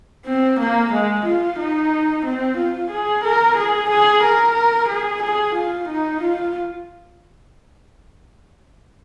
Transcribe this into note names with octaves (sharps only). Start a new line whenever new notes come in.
C4
A#3
G#3
F4
D#4
C4
F4
G#4
A#4
G#4
G#4
A#4
G#4
G#4
F4
D#4
F4